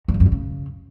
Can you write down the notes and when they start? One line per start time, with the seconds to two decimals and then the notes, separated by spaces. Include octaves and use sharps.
0.08 G2
0.14 E2
0.20 F#2
0.26 D3
0.32 C#3